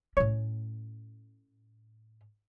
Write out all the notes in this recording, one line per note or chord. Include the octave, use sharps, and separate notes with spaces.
A2 C#4 C#5